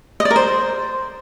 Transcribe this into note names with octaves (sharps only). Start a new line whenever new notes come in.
D#5
D5
A#4
C5